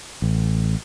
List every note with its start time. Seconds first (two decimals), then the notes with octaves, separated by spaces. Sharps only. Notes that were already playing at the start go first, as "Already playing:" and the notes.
0.22 A1